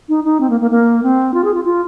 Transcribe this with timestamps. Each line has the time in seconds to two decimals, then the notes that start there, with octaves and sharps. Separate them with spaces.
0.09 D#4
0.24 D#4
0.41 C4
0.50 A#3
0.61 A#3
0.71 A#3
1.03 C4
1.34 F4
1.44 G#4
1.54 F4
1.65 F4